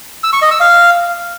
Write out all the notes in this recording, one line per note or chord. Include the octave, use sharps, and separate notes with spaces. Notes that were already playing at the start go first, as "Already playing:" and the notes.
E6
C#6
D#5
E6
F5